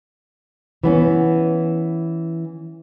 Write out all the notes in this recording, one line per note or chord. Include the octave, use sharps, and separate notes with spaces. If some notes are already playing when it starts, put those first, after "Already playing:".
E3 B3 C#4